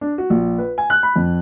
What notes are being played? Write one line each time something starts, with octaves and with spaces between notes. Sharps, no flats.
D4
F#4
A#1
B4
G#5
F#6
B5
F2